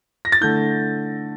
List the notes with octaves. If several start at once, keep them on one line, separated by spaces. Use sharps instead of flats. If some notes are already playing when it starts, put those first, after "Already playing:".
A#6
A6
D3 A3 E4 G6